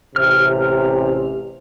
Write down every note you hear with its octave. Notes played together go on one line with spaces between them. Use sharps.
A1 C3 F6